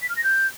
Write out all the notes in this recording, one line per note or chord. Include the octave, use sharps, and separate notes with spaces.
B6
F6
A#6
G6